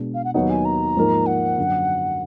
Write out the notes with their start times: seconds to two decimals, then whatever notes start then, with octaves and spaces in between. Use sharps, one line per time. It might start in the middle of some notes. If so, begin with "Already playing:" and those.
Already playing: B2 G#3 B3 D4
0.14 F5
0.24 F#5
0.34 D#2 D#3 F#3 B3 D#4 F#5
0.50 G#5
0.65 A#5
0.96 G#2 F3 A#3 D#4 A#4
1.26 F#5
1.57 F#2 D3 F#3